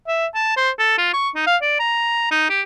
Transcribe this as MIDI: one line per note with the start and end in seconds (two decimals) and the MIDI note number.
0.08 0.27 76
0.35 0.53 81
0.57 0.70 72
0.79 0.96 69
0.98 1.09 65
1.14 1.30 85
1.36 1.45 63
1.47 1.57 77
1.62 1.80 74
1.80 2.30 82
2.31 2.45 63
2.50 2.62 67